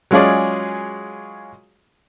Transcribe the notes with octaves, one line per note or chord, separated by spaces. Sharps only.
F#3 G#3 C#4 F4 G#4 D5